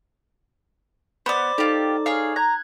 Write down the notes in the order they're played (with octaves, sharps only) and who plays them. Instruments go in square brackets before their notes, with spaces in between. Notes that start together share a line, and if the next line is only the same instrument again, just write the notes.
[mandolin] B3 [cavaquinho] C5 D5 [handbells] B5
[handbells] D#4 A4 [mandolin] F4 G4
[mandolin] G#4 C#5 F5
[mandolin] A#5 [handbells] F#6 G#6